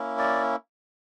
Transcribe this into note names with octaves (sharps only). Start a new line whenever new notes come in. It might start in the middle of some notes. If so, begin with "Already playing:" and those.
Already playing: A#3 C#4 E4
D5